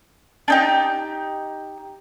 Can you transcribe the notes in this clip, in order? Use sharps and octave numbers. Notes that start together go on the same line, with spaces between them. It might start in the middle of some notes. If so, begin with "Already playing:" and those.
D4 D#4 G4